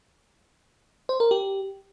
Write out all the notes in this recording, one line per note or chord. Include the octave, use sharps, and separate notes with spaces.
C5
A#4
G4